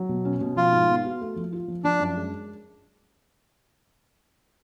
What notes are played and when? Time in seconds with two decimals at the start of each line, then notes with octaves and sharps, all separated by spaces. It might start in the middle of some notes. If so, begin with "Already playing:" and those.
Already playing: F#3
0.09 B2
0.25 C#4
0.41 B2
0.56 F3 F4
0.72 G#2
0.89 B3
1.05 F#4
1.21 A3
1.36 F3
1.53 F4
1.68 F3
1.84 F3 D4
2.00 F#2
2.16 G#3